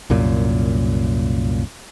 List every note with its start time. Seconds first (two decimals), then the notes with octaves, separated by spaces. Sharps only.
0.10 C2 F#2 A#2